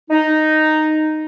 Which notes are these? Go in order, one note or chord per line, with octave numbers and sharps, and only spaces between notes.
D#4